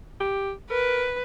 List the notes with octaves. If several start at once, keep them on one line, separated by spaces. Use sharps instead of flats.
G4
A#4 B4